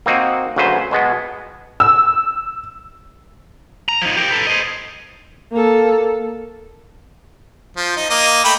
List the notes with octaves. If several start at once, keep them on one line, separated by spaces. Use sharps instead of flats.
A#3 C4 D#4 F#4
D2 C#3 F#3 B4 C5
B2 G#3 B3
E6
A#5
F3 D#4
G4 A#4
A4 B4
C5 D#5
A#3 A4
F3
D#4
A#3 D#5
A3 G5 B5